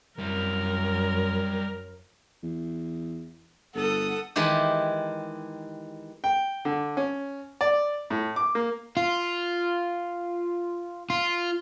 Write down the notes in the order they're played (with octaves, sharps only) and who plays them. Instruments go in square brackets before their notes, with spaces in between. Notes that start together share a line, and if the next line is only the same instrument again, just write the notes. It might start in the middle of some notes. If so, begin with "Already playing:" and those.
[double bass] F#2 [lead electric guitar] G3 E4 [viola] A#4
[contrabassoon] E2
[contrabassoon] G1 [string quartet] A4 F#5 D#6
[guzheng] D#3 E3 G#3 G4
[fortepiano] G5
D3
C#4
D5
A2
D6
A#3
[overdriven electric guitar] F4
F4